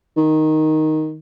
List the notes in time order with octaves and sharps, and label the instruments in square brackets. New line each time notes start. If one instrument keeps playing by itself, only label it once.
[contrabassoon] D#3